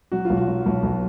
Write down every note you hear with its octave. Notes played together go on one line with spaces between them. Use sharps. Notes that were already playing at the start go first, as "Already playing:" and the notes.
F#3 F#4
B1 F4
F#4
F#3
B1
B1